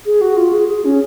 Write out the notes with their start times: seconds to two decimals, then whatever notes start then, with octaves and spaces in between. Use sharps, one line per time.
0.06 G#4
0.21 F#4
0.37 F4
0.53 G#4
0.68 G#4
0.85 C#4